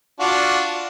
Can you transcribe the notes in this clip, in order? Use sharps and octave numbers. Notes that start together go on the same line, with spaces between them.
D4 F4 F#4